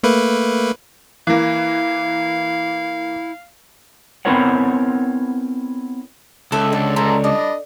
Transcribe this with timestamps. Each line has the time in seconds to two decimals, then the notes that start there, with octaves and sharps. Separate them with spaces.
0.03 A3 A#3 B4
1.27 E3 A#3 E4 F5
4.25 B3 C4 E4 A#4 C#5 F#5
6.52 C#2 A4 E5
6.72 D3 D4 A4
6.96 D3 A4 A#5 C6
7.24 G3 D4 D#5